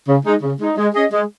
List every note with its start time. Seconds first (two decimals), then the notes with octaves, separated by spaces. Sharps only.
0.07 C#3
0.24 G#3 D#4
0.42 C#3
0.59 G#3 D#4
0.77 G#3
0.95 C#4 G#4 D#5
1.12 G#3